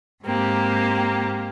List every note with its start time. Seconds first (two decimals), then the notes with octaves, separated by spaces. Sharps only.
0.25 G#2 A#3 C4 G4